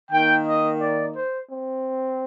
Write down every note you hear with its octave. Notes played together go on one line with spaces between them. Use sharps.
D#3 A#3 D#4 G5
D#5
D5
C5
C4